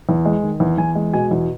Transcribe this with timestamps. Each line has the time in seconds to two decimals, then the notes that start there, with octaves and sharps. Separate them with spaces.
0.09 E2
0.25 G#3
0.43 D#3
0.60 E2
0.78 E2 G#5
0.95 G#3
1.14 B2 G#5
1.31 E2